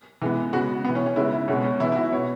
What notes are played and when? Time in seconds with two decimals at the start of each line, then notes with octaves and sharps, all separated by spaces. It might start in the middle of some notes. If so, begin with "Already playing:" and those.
0.22 E3 G#3 B3
0.53 C#3 G#3 B3 F#4
0.85 B3
0.89 E3
0.95 C#4
1.06 C#4
1.16 C#3 G#3 B3 E4
1.32 E4
1.48 B2 G#3 B3 C#4
1.64 C#4
1.80 E3 B3 E4
1.92 E4
1.96 F#4
2.12 B2 B3 C#5